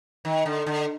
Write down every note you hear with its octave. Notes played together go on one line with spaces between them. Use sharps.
D#3
D3
D3